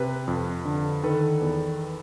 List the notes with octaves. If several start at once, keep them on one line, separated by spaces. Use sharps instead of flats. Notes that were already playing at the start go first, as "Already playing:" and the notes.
Already playing: C3 B4
F2
D3
D#3 A4 B4
E2